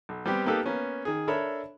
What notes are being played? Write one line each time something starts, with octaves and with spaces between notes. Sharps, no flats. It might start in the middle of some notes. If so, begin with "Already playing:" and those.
B1
G3 B3 C4 G4
A#3 B3 D#4 G4 A4 B4
A#3 B3 C#4
D#3 G#4
D4 A4 A#4 C#5 E5 B5